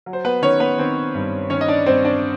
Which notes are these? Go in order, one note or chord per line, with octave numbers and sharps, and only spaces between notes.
F#3
C5
B3 B4
D#3 C#4 C#5
B3 B4
D#3 C4 C5
G2
D#3 C#4 C#5
D#5
D4 D5
G2 C4 C5
D4 D5